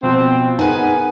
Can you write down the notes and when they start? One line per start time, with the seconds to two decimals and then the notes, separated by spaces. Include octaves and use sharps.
0.03 B2 F3 C4
0.59 B3 D#4 G#4 A#4 B4 G#5